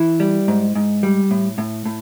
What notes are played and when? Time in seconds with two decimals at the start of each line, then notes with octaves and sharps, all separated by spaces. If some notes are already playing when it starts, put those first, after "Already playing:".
Already playing: E3 E4
0.20 G3
0.48 G#2
0.75 G#2
1.03 G3
1.31 A2
1.58 A2
1.85 A2